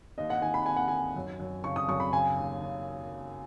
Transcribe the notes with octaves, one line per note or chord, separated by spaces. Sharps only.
D#2 D#5
F#5
D#3 G#5
B5
D#2 G#5
F#5
D#3 G#5
F#2
F#2
C#3 C#6
D#6
F#2 C#6
B5
C#3 G#5
D#2
C#3